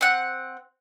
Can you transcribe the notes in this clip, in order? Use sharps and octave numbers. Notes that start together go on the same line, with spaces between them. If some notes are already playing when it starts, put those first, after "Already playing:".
C4 F#5